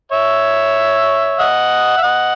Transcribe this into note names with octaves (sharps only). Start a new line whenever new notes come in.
C#5 E5
D#5 F#5
E5
D#5 F#5